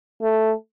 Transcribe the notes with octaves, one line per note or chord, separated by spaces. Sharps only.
A3